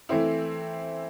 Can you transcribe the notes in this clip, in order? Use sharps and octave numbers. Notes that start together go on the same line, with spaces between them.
E3 A3 C4 E4